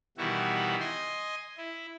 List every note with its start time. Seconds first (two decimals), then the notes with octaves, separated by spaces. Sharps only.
0.17 B2 D#3 E3 G3 E4 F#4
0.80 D#5 G#5 C6
1.57 E4